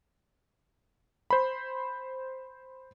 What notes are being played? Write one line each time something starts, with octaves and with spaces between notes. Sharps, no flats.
C5 B5